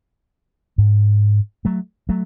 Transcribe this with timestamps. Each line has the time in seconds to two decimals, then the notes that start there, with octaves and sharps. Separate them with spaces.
0.78 G#2
1.65 F#3 A3
2.09 F#3 A3